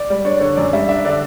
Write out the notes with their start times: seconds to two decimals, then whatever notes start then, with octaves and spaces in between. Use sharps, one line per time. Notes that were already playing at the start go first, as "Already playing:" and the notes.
Already playing: D5
0.10 G3
0.25 D4 C#5
0.32 D5
0.40 D3 C#5
0.56 F#2 D5
0.73 G3 E5
0.89 D4 E5
1.05 D3 D5